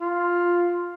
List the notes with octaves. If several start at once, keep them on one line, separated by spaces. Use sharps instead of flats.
F4